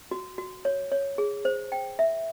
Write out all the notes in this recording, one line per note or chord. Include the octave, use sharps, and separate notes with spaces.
F#4
F#4
C#5
C#5
G#4
C5
G5
E5